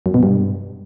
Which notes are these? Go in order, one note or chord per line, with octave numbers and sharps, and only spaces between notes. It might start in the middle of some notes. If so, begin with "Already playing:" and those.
F#2
B2
G2